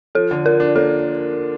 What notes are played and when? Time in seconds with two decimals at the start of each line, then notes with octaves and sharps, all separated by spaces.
0.15 F3 A4
0.31 D3
0.46 F3 A#4
0.60 D4
0.76 A#3 A4